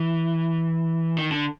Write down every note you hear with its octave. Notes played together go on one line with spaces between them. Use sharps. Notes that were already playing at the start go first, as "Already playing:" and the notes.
Already playing: E3
D#3
D3